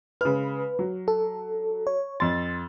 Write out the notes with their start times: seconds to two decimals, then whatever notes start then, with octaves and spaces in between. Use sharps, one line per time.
0.21 C#3 G#3 B4 F6
0.79 F#3
1.08 A4
1.87 C#5
2.20 F2 C6 A6